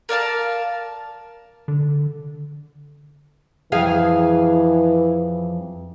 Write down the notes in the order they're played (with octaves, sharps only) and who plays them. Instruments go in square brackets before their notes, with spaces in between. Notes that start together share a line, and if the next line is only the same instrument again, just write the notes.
[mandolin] A#4 D5 F5 A5
[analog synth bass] D3
[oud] F2 G#4 F5 [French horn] E3